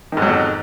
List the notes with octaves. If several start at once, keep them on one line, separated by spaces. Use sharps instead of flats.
F2 G#2 D#3 F#3